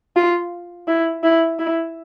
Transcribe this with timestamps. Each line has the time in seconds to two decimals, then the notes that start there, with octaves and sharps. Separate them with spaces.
0.16 F4
0.88 E4
1.23 E4
1.59 E4